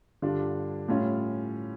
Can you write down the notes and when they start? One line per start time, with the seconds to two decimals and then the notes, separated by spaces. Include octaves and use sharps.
0.22 G2 D3 G3 D4 F4
0.88 A2 G3 C#4 F4